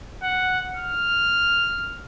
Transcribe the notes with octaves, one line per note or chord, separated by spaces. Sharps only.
F#5
F6